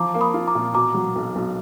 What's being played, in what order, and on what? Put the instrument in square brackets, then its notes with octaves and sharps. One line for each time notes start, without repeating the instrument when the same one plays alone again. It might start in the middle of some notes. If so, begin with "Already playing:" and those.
Already playing: [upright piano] F3 [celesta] A#5 D6
[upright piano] A#3
[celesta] B5 D#6
[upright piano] F4
[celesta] A#5 D6
[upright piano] A#2
[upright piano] B2 [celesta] A#5 D6
[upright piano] F#3
B1
B1